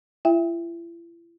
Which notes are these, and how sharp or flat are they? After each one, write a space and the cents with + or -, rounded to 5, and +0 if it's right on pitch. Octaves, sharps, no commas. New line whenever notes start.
E4 +45 E5 +10 G5 +25